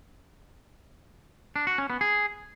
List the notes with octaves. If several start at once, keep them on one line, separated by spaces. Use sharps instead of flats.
D4
F#4
C#4
B3
G#4